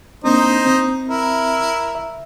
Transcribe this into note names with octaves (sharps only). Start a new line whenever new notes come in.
A#3 C4 D4 D#4 C5 D#5
C4
E4 A#4
E5